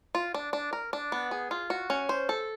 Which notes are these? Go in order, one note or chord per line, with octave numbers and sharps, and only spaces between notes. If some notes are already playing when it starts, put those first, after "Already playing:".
F4
D4
D4
A#4
D4
B3
G#4
F4
F#4
C#4
C5
A4